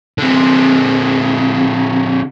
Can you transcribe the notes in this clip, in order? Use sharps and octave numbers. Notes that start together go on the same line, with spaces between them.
D3 C4